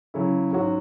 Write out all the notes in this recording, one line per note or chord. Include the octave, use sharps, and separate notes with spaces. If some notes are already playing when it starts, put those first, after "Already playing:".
C#3 F#3 C#4 E4
G#2 F#3 C#4 F#4